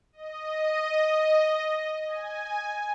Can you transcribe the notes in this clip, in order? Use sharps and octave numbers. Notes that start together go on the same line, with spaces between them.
D#5
G#5